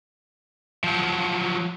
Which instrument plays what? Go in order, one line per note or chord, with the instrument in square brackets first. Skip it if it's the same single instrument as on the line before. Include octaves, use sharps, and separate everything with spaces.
[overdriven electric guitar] F3 F#3